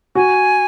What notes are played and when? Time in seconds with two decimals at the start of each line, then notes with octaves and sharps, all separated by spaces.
0.15 F#4 G#5